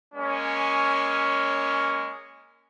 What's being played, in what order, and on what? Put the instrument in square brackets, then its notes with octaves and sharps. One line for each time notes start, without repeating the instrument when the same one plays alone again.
[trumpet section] G#3 A#3 C#4